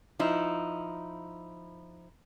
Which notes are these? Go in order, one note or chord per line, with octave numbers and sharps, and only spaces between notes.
F3 D#4 E4